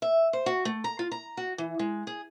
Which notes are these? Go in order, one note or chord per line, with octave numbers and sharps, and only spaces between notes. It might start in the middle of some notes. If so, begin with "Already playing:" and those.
E5
C5
F#4
A3
A#5
F4
A#5
F#4
E3
G#3
G#4